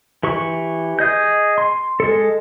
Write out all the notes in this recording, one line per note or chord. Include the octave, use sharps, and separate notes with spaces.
E3 G4 C#6
G#4 D#5 G6
C6
G#3 A4